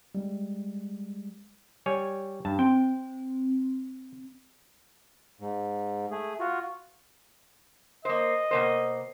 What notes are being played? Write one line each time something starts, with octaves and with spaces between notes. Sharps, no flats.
G3 G#3
G3 C#5 G#5
G2 A5
C4 G5
G#2
A3 G#4
F4 F#4
A#3 C5 D#5
B2 A#3 C5